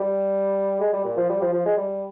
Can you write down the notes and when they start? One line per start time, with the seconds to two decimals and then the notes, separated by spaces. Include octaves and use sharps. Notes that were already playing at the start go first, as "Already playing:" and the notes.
Already playing: G3
0.80 G#3
0.93 G3
1.05 A#2
1.17 F3
1.29 G3
1.41 F3
1.53 F3
1.65 G#3
1.77 G3